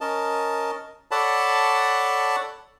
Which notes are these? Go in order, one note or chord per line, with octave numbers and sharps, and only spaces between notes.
C#4 A#4 D#5 A5
A4 C#5 D5 F#5 A5 B5